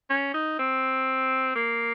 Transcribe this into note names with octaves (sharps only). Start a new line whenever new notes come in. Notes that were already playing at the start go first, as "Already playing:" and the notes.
C#4
D#4
C4
A#3